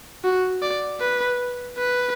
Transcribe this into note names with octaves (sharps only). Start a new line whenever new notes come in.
F#4
D5
B4
B4